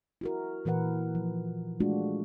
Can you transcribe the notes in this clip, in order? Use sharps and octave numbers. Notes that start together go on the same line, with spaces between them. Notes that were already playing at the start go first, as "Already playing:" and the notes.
E4 F#4 A#4
A#2 E3 A#4 B4 F#5
F3
G#3 A3 D4 F4 F#4